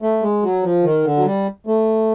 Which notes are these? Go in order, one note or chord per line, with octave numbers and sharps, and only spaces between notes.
A3
G#3
F#3
F3
D#3
D3
F#3
G3
A3